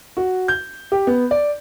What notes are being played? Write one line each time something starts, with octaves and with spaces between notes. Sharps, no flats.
F#4
G6
G4
B3
D5